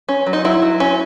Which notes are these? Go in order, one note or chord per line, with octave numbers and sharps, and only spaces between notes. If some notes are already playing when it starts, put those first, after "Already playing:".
C#4
F#3
D#4
F#3 E4
F#3
C#4